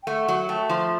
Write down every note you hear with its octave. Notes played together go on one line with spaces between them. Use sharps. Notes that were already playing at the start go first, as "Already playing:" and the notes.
G5
A3 F#5
F#3
A3 G5
F3 C6